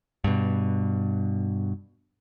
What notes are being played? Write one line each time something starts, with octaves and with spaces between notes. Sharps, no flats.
G2 B2